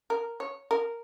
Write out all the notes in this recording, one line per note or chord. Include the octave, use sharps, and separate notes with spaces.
A#4
C#5
A#4